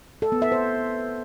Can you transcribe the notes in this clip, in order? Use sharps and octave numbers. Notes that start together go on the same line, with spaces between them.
A4
B3
E5
C5